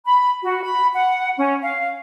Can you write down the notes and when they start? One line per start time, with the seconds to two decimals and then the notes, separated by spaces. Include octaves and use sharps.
0.05 B5
0.43 F#4
0.63 B5
0.93 F#5
1.37 C#4
1.62 F5